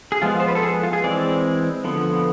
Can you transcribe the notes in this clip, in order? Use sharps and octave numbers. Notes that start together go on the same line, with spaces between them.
G#4
F3 G#3 B3 F4
C5
B4
A4
G#4
F4
G#4
E3 G#3 C4 D5
D3 F3 B3